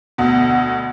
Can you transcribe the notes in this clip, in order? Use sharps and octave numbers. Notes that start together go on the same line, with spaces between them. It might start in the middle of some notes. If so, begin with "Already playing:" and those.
D2 B2